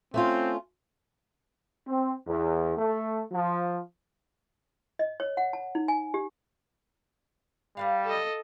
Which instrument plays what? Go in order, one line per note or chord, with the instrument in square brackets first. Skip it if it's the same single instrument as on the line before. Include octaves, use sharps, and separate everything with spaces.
[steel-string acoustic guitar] A3 C#4 F4 [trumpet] C4
[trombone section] C4
E2
A3
F3
[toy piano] D#5
C#5
F#5
A5
D#4
G#5
G4
[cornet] G3 [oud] A#4 B4 F5
[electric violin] A4 D#5